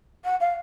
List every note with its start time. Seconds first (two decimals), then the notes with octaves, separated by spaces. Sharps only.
0.24 F#5
0.40 F5